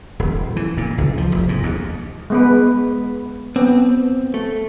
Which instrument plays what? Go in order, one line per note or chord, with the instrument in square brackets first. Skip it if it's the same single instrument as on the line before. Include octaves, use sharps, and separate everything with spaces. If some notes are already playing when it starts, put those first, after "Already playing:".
[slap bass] D#1
E3
A#2
C#2
F3
F1
G#2
D#2
[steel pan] G#3 B3 B4
[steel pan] B3 [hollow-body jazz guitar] C4
[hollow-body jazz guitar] A3